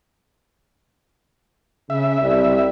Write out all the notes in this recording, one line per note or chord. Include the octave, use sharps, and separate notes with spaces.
C#3 E5
C2 G3